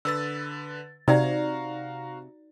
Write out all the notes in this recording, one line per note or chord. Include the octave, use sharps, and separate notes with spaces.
D3 B4 E6 A6
C3 D#4 F#4 D5 F5 A#5